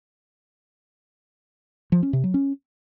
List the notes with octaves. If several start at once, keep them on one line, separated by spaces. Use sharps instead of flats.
F3
C#4
C3
F#3
C#4